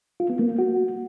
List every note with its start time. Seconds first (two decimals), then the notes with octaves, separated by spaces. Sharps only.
0.20 F4
0.30 B3
0.39 A#3
0.49 B3
0.59 F#4